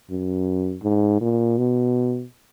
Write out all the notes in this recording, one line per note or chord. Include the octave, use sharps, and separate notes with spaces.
F#2
G#2
A#2
B2